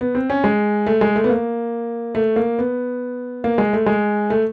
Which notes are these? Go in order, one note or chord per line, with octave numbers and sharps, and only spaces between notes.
B3
C4
C#4
G#3
A3
G#3
A3
B3
A#3
A3
A#3
B3
A#3
G#3
A3
G#3
A3